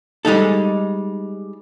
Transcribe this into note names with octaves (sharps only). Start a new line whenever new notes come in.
G3 G#3 D#4 A4